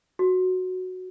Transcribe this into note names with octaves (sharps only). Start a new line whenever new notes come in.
F#4